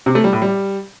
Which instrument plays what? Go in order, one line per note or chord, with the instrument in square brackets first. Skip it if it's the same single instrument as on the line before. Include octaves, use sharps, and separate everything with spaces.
[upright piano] C3
A3
G3
A2
G3